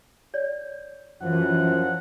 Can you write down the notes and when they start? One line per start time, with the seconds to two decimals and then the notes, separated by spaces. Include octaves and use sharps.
0.34 C#5 D5
1.22 F#2 E3 F3 F#5